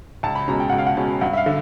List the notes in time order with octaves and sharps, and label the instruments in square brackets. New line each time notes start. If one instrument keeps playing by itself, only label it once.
[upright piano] C#2 A5
B5
B2 G#3 C#4 A#5
G5
C#2 F#5
F5
F#5
B2 G#3 C#4
G2 F#5
E5
F5
D3